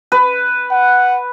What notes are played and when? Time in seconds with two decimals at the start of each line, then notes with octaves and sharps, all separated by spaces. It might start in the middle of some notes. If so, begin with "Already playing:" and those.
0.12 B4
0.71 F#5